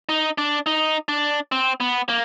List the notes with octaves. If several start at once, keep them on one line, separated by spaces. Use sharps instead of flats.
D#4
D4
D#4
D4
C4
B3
A#3